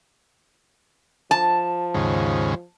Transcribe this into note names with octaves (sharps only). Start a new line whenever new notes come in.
F3 A5
D#2 G#2 C#3